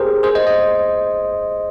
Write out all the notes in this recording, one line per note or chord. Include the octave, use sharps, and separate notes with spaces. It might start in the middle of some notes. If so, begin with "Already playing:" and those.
Already playing: G4 G#4 A#4 C5
G#4 C5
C5 D#5
C5 D#5